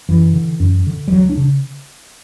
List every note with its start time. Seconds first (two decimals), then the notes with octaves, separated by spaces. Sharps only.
0.09 F#2 E3
0.34 D3
0.60 F#2
0.87 D3
1.08 G3
1.12 C#2 F#3
1.29 D4
1.37 C#3